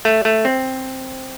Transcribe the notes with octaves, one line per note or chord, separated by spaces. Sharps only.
A3
A3
C4